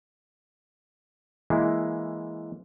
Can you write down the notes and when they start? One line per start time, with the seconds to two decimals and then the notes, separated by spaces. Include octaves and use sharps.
1.50 E3 G#3 A#3 E4